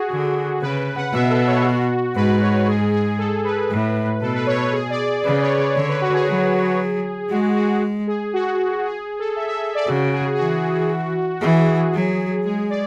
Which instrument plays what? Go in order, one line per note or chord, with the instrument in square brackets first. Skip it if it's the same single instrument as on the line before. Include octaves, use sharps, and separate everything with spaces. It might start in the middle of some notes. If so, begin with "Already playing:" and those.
Already playing: [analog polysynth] F#4 G#4
[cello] D3
[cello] C#3 [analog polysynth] B4
[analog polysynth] F#5
[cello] B2 [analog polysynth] E5
[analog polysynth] A4
C#5
F#4
[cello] G#2 [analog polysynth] B4
[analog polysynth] C#5
G#4
G#4
A4
B4
[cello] A2
[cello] B2 [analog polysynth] A4
[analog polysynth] B4
C#5
B4
G#4
D5
[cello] C#3 [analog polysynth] B4
[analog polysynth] C#5
D5
[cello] D3 [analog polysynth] C#5
[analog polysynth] B4
F#4
G#4
[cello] F#3 [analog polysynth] G#4
[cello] G#3 [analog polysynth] F#4
[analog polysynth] F#4
G#4
F#4
G#4
A4
E5
E5
E5
D5
[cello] C#3 [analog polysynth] F#4
[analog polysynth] G#4
G#4
[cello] E3 [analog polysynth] F#4
[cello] E3 [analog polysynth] G#4
[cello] F#3
[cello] G#3 [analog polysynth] G#4
[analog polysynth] D5